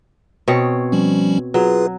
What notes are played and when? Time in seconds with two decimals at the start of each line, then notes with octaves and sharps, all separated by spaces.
0.48 B2 C4 C#5
0.92 F3 G3 C#4
1.54 F#3 F4 G#4 B4